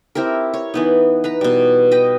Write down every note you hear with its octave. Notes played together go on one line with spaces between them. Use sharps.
C4 E4 G4 A#4
C#5
E3 B3 D#4
B4 A#5 B5
B2 G3
D#5 G5 B5